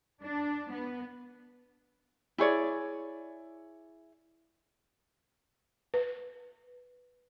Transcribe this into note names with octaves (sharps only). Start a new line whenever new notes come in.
D4
B3
E4 G#4 C#5 D5
B4